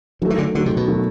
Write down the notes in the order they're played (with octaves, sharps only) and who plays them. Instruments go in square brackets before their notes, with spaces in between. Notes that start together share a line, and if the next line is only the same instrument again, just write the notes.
[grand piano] D#3 F#3 A3 [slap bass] F3
[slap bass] E3
D3
[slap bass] D3 [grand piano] D#3 F#3 A3
[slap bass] C3
B2
[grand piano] D#3 F#3 A3